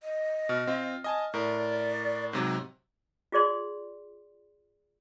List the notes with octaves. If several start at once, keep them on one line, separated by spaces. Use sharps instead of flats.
D#5
B2 F6
C4 F4
D#5 G#5 A5
A2 A#4 D5
G#2 C3 F#3 A#5
F4 G#4 D5 C6